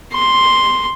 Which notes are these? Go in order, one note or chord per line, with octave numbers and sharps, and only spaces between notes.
C6